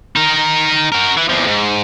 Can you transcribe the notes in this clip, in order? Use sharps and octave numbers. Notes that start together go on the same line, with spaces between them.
D#4 A#4
F#4 A#4
E3
E2 F3
G#2